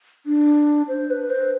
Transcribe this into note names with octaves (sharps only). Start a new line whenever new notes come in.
D4
C5
B4
C5